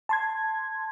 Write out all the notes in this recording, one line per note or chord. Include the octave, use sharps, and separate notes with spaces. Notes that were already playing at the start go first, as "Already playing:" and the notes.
A5 C6 G#6